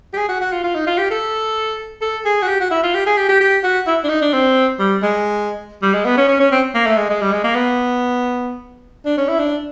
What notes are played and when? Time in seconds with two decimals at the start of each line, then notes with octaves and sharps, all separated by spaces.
0.13 G4
0.17 G#4
0.29 F#4
0.41 F#4
0.52 F4
0.64 F4
0.75 D#4
0.87 F4
0.98 G4
1.10 A4
2.01 A4
2.25 G#4
2.42 F#4
2.47 G4
2.60 F#4
2.71 E4
2.83 F4
2.95 G4
3.06 G#4
3.17 G4
3.28 G4
3.40 G4
3.63 F#4
3.87 E4
4.04 D4
4.09 D#4
4.22 D4
4.33 C4
4.79 G3
5.02 G#3
5.82 G3
5.94 G#3
6.05 B3
6.17 C#4
6.28 C#4
6.40 C#4
6.52 C4
6.75 A#3
6.86 A3
6.97 G#3
7.10 G#3
7.21 G3
7.32 G#3
7.44 A#3
7.55 B3
9.05 D4
9.17 C#4
9.28 E4
9.39 D4